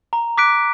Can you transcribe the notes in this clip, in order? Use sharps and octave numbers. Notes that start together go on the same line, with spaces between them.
A#5
D6 F#6 B6 D7